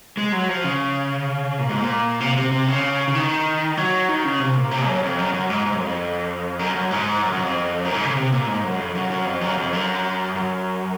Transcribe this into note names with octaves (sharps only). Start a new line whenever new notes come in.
G#3
F#3
F3
C#3
A#2
G#2
A#2
C3
C3
C3
C#3
C#3
D#3
F#3
D#3
C#3
C3
A#2
C3
F#2
F2
F#2
F#2
G#2
G#2
F#2
F2
F#2
F#2
G#2
F#2
F#2
F2
F#2
G#2
C#3
C3
A#2
G#2
F#2
F2
F#2
F#2
F2
F#2
F2
F#2
F#2